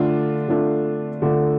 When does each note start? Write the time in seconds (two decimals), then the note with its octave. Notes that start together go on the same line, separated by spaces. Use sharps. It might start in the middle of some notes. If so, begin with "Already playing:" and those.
Already playing: D3 A3 D4 F4
0.48 D3 A3 D4 F4
1.22 D3 A3 D4 F4